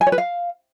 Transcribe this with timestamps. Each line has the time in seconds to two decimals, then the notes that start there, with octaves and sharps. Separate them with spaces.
0.01 G#5
0.07 C#5
0.12 B4
0.18 F5